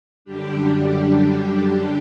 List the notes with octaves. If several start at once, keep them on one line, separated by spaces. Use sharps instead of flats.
F#2 D3 G3 D4 G4
G4
G4